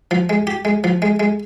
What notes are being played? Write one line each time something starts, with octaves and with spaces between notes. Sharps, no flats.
F3
G#3
G4
G#3
F3
G#3
G#3